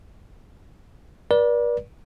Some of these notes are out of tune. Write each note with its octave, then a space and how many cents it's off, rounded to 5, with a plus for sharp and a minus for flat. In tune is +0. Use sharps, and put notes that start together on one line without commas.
B4 -45 D5 +0